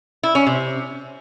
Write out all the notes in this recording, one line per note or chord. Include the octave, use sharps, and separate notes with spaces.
E4
C#4
C3